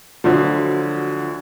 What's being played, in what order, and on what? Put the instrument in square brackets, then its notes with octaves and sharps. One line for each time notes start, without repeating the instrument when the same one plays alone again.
[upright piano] D2 D3 F#3 [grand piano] F3